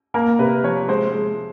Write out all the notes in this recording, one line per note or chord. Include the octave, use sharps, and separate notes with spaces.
A#3 A#4
C3 B4
F3 C#5
G#3 C5
G#3